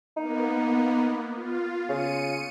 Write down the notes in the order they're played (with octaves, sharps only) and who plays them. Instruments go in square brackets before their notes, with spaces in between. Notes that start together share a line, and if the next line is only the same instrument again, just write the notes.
[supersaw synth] A#3 B3 [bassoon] D#4
[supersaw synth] F4
[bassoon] C#3 [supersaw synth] C#7 D#7